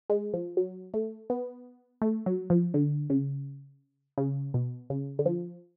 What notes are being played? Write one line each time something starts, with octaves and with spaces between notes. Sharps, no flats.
G#3
F3
F#3
A3
B3
A3
F#3
F3
D3
C#3
C#3
B2
C#3
D3
F3